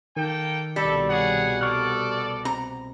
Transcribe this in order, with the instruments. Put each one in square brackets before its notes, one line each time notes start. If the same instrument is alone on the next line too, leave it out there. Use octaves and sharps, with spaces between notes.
[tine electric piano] D#3 [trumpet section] A#3 A4 G5
[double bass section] C2 B2 [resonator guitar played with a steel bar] G3 [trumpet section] A4
[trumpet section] G#4 C#5 F#5
[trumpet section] A4 D5 [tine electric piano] C#6 F6 F#6
[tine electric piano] C4 [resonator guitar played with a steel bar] A#5